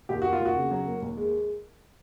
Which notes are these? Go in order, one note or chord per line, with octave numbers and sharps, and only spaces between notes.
D#2 G4
A#3 F#4
F4
D#2
F#4
C#3
F#3
A#3
D#2
G#3